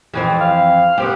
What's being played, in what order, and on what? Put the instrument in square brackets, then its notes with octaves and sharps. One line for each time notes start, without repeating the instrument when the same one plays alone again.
[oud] F2 E3 C4
[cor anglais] F5
[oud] B3 C4 G4